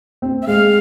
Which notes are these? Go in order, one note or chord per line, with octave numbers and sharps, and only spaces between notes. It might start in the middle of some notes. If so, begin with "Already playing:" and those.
C4
E5
G#3 F5